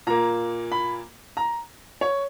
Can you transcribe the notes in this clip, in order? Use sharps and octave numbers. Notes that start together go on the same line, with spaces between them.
A#2 A#3 A#5
B5
A#5
C#5